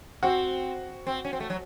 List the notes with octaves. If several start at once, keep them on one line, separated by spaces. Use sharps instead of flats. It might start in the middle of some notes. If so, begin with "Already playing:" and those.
C4 F#4
C4
C#4
C4
A3
F#3